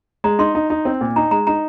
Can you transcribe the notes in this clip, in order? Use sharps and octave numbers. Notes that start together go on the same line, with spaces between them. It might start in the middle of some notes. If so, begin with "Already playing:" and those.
G#3 A#5
D#4 C6
D#4
D#4
C4
A#2
D#4 A#5
G#3 A#5
D#4 A#5